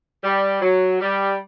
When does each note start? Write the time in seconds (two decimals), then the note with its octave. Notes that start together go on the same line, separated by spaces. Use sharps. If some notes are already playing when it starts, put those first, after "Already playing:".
0.23 G3
0.61 F#3
1.00 G3